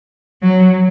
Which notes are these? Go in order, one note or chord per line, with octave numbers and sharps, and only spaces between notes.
F#3